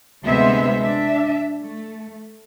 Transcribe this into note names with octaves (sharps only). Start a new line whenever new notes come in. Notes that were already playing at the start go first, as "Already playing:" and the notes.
D2 C3 G#3 B3 C5 E5
D4 E5
A3